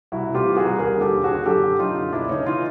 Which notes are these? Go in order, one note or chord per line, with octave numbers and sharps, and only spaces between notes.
C2 E4 F#4
C3
F4 G4
E3
F#4 G#4
C2
D#2 G#4 A#4
D3
G4 A4
D#2
F#4 G#4
D3
F#2 G4 A4
D3
F#2 D#4 F4
D3
C#2 D4 E4
C#3 C#4 D#4
E3 D#4 F4